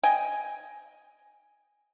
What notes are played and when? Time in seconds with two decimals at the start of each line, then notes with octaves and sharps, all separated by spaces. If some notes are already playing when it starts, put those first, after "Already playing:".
0.03 D#5 G5 G#5